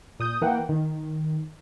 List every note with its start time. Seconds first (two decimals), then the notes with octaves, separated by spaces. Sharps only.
0.19 A#2 D#6 G6
0.41 E3 A#3 F#5 G5
0.69 D#3